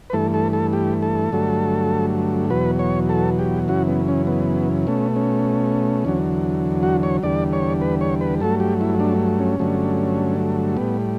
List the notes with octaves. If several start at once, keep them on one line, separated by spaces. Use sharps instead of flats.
B4
G2 E3 A3 A4
A4
A4
G4
A4
G2 D3 F#3 A3
E2 B2 F#3 B4
C#5
A4
G4
F#2 C#3 E3 F#4
B3
C#4
B3
B2 A3 C#4
C#4
E2 D3 F#3
F#4
C#5
E2 D3 G3 D5
C#5
B4
C#5
B4
G2 F#3 A3 A4
G4
E4
D4
C#4
G2 D3 F#3 A3
A2 G3 B3